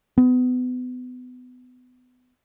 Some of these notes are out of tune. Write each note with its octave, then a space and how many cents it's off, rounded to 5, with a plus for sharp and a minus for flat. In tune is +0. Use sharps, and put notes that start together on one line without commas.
B3 +25